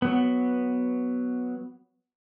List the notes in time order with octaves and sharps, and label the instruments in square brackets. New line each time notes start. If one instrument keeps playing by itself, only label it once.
[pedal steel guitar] F#3 B3